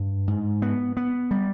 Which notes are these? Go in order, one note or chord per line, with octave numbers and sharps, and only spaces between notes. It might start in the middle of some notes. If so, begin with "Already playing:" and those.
Already playing: G2
G#2
B3
B3
G3